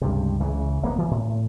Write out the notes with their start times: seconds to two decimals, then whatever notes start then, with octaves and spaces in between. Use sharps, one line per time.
0.02 C#2 G2 C3
0.40 C#2 C#3 E3
0.82 E1 A#3 B3
0.98 E3
1.11 A2